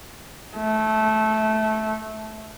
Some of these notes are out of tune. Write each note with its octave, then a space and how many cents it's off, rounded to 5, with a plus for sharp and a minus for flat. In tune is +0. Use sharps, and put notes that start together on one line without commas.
A3 -15